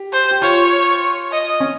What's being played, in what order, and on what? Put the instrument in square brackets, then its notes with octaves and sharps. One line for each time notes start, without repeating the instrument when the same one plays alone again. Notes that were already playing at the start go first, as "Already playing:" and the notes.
Already playing: [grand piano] G4
[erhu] C5
[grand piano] G4
[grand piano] F4 [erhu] C#5
[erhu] D#5
[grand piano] C#4